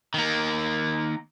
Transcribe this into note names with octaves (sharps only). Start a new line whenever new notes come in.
D#3 A#3